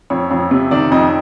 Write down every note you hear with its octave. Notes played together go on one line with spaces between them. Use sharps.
F2 C#5
F2
C3
D#3 D5
F2 D#5